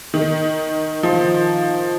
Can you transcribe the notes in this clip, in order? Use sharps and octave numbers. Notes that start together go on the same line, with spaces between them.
D#3
F3